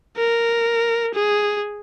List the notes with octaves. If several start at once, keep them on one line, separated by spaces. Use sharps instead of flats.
A#4
G#4